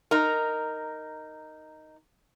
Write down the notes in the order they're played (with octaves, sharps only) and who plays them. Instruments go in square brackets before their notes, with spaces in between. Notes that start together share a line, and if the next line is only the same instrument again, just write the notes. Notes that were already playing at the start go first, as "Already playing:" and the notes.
[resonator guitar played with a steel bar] D#4 A#4